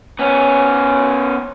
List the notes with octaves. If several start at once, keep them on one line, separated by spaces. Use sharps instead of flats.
B3 C#4